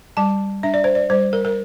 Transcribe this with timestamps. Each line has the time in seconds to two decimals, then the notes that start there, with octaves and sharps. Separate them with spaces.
0.17 G3 A5
0.63 D4 E5
0.74 D5
0.84 C5
0.95 D5
1.10 G3 C5
1.33 A#4
1.45 A#4